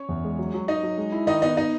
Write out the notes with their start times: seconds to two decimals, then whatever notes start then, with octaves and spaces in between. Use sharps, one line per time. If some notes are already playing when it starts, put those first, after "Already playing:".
Already playing: C#4 C#5
0.09 E2
0.24 G#3
0.39 F#3
0.54 F#3
0.68 F#3 D#4 D#5
0.83 F#3
0.97 G#3
1.12 E4
1.27 D#3 D#4 D#5
1.42 B3 D#4 D#5
1.57 B3 D#4 D#5